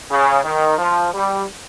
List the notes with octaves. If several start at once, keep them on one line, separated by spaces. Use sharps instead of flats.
C#3
D#3
F3
G3